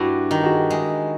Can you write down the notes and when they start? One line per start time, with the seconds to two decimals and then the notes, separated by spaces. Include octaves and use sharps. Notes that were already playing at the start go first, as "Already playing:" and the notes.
Already playing: G2 E4 F#4
0.31 D#3
0.44 F#4 G#4
0.70 G#3